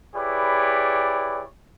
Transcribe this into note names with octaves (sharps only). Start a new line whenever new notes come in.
E4 G4 G#4 B4 C#5 D5